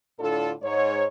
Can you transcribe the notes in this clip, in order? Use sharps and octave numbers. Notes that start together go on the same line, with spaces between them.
A2 D3 D4 F4 A4
G#2 C#5